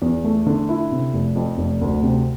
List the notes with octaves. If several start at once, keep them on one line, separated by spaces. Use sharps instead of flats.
E2
A3
D3
E4
C3
F1
F2
F1
D2
C3